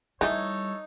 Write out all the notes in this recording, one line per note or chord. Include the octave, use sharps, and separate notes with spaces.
E3 G3 A3 D#4 A4 C#5